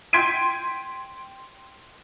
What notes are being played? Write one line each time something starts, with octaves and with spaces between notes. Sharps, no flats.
G5 C6 G#6 B6 D7 D#7